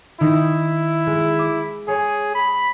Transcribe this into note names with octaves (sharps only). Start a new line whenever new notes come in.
D#3 D#4 E4
G#3
D6
G#4 C#5 G#5 C#6
B5